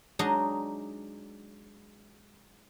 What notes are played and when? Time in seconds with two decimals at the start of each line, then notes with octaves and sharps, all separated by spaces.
0.19 F#3 G#3 D4 D#4 G#4